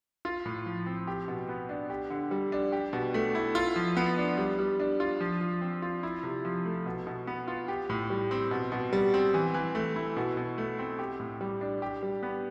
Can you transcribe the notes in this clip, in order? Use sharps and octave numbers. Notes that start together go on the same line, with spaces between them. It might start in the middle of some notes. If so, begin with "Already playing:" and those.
F4
A2
F3
C4
G4
B2
B3
D4
G4
D3
G3
D4
G4
B2
A3
E4
F4
F3
B3
D4
G3
G3
D4
F4
F3
F3
C4
F4
E4
C3
F3
A3
B2
B2
B3
F4
G4
A2
G3
C4
B2
B2
G3
C4
E3
E3
A3
E4
B2
B2
A3
C4
G4
A2
G3
D4
G4
G3
B3